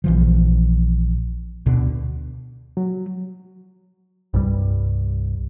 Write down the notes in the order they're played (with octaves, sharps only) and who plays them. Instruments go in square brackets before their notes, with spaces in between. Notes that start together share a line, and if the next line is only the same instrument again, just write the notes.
[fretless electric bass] A#1 E3 F3
D2 B2 D3
[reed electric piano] F#3
[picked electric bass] C2 G2 G3